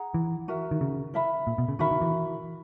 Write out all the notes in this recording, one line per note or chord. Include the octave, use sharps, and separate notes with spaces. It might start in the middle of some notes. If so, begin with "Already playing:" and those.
Already playing: G#4 F#5 A#5
E3
F#4 A#4 E5
D#3
C#3
A#4 E5 B5
A#2
B2
C#3
D#3 F#4 A#4 E5 B5
D#3
E3